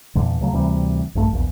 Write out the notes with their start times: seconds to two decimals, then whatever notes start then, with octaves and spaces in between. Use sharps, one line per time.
0.15 E2 A#2 D3
0.41 C#2 C#3 F#3 A3
0.53 D2 C3 E3 G3
1.15 A#1 G2 A3
1.33 A#1 E2